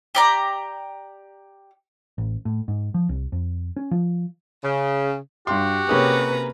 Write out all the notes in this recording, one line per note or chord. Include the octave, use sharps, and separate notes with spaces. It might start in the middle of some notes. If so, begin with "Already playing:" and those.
G4 D5 A#5
A1
A2
G#2
F3
C2
F2
C#4
F3
C#3
G2 F#4 G4 C6
C3 A#3 C#4 G#4 B4 A#5